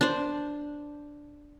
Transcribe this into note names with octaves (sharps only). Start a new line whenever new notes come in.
D4 C5